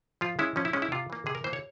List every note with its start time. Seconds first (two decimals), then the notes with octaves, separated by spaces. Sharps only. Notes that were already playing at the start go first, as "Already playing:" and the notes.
0.21 F3 F4
0.39 G#3 C#4 E4
0.56 F3 C#4
0.65 E4
0.73 G#3 C#4
0.82 E4
0.92 C3 F4
1.10 E3 A#3
1.26 C3 G#4
1.35 A#4
1.44 E3 A#3 C5
1.53 C#5